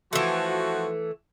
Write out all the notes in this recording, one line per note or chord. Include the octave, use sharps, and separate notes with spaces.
E3 F3 A3 F#4